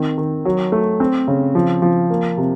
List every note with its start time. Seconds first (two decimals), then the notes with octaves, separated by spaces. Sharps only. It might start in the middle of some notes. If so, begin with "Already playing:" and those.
Already playing: D#3 C4
0.18 D#3
0.45 F#3
0.72 A3
1.00 C4
1.28 C#3
1.55 F3
1.82 F3
2.10 A#3
2.37 C3